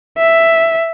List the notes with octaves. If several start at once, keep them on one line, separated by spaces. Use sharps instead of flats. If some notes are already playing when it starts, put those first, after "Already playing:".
E5